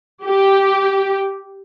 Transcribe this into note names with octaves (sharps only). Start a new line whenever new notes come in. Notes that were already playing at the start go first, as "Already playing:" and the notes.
G4